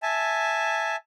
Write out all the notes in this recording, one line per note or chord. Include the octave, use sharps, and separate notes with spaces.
E5 G#5 A5